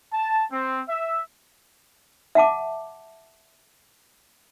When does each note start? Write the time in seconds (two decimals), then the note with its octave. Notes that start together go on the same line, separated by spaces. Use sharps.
0.14 A5
0.52 C4
0.89 E5
2.35 E5 F#5 A5 D6